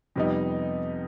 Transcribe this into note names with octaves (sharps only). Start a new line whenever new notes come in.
F2 C3 G3 B3 D#4